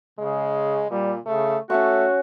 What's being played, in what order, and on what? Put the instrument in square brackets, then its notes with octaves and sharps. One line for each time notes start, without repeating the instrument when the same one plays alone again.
[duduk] C#3 [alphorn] G#3
[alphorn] A#2 [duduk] G3
[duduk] C#3 [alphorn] A3
[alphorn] A3 [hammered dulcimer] C#4 E5 C#6 [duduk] F#4